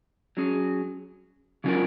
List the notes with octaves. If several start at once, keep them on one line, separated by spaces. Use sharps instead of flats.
F#3 C#4 G#4
C#3 F#3 C#4 F4 A#4